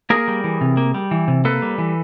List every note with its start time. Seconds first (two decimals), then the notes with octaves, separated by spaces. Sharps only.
0.10 A#3 G#4 A#4
0.28 G3
0.44 E3
0.61 C3
0.77 A#3
0.94 G3
1.11 E3
1.28 C3
1.45 A#3 A4 B4
1.62 G3
1.78 E3